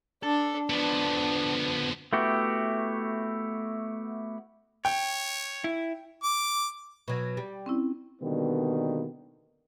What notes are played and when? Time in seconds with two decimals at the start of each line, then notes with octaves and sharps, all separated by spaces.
0.23 D4 A4
0.70 D3 F3 B3 D4
2.13 A3 B3 E4 F#4 G4
4.85 C#5 G5
5.64 E4
6.23 D6
7.08 B2 F#3
7.37 G3
7.66 C4 C#4 E4
8.22 B2 D3 D#3 G3 A#3 B3